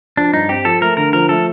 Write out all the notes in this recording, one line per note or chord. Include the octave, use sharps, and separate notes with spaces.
F3 D4
G2 D#4
C4 G4
F3 A4
A3 A#4
D3 A#4
F3 A#4
A3 A4